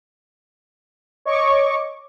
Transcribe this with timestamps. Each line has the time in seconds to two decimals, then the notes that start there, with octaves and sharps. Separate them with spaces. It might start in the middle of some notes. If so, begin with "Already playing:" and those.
1.25 C#5 D#5 C#6 D6